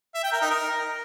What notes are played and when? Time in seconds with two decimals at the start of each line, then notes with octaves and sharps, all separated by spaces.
0.14 E5
0.23 G5
0.32 A#4
0.42 D#4
0.51 A#4